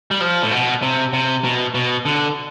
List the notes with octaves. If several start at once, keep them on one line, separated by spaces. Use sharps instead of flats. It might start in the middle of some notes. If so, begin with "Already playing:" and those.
G3
F3
A2
B2
C3
C3
B2
B2
D3